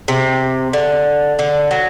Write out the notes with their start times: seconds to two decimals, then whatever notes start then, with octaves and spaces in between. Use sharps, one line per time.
0.08 C3
0.73 D3
1.39 D3
1.71 F#3